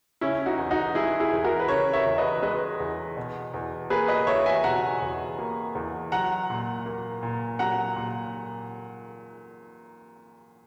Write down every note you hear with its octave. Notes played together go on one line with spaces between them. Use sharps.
C#3 C#4 E4
D#4 F#4
E2
D#4 F#4
G#3 E4 G#4
E4 G#4
E2
F#4 A#4
B4
C#3 A#4 C#5
C#5 E5
E2
B4 D#5
G#3 B4 D#5
E2
B2
E2
A#3 G#4 B4
B4 D#5
E2 C#5 E5
E5 G#5
B2 F#5 A#5
E2
A#3
E2
F#3 F#5 A#5
A#2
A#3
A#2
F#3 F#5 A#5
A#2